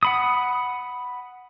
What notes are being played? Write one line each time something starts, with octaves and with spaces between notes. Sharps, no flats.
F#5 B5 D#6